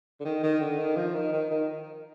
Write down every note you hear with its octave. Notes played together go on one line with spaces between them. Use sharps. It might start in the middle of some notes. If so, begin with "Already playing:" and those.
D3
D#3
D#3
D3
D#3
F3
D#3
D#3
D#3